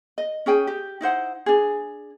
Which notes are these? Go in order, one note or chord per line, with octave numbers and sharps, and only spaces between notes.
D#5
C#4 G#4 G5 G#5
G4
D#4 E4 C5 F#5
D4 G#4